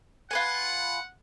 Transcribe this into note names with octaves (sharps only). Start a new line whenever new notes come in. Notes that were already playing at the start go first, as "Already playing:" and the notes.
F4 B4 F#5 G#5